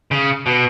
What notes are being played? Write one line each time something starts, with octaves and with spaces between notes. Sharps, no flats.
C#3
B2